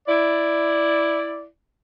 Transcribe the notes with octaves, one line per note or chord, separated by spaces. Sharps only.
E4 D5